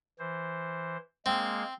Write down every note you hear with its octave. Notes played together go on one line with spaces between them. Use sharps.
E3 C5
G#3 A#3 C4